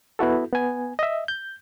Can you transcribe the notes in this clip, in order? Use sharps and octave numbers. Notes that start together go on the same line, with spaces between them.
B3 E4 F#4 A4
B3 G#5
D#5 E5
G6